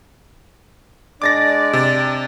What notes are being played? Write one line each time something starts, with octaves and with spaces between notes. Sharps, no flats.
G#3 D4 D5 D6 A6 A#6
C3